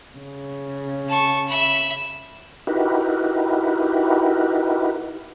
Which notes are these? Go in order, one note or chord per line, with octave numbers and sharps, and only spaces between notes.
C#3
A5 C#6
E5 B5
D#4 E4 F#4 G4 A#4 B4